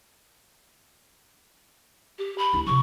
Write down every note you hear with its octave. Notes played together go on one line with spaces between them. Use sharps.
G4
B5
D2 E4
C3 F3 C#6